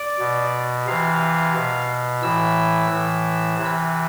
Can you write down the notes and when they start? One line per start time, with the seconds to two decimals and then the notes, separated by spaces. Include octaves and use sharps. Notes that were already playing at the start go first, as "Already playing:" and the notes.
Already playing: D5
0.19 B2
0.86 C3 E3 F5
1.54 B2
2.23 A2 E3 E6
2.90 A2 E3
3.59 C3 E3